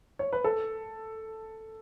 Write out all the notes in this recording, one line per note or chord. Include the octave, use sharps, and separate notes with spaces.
C#5
B4
A4